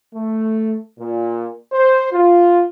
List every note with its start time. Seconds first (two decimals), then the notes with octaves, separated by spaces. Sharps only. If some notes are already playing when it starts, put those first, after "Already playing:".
0.15 A3
1.00 A#2
1.73 C5
2.12 F4